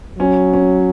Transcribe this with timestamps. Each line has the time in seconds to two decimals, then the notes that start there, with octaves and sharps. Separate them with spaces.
0.19 F#3 C#4
0.53 C#4